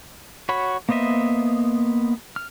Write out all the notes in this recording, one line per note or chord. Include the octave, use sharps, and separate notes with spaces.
F#4 C#5 B5
A#3 B3 C5 D#5 E5
F6